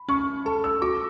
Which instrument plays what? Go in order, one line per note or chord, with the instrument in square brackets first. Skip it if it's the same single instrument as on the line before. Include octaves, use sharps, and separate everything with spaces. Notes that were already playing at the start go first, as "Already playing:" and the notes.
Already playing: [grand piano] B5
[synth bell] C#4 [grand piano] C#6
[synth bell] A4 [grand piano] A5
[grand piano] E6
[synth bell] F#4 [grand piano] D6